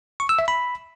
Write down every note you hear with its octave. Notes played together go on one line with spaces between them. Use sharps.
C#6
E6
E5
B5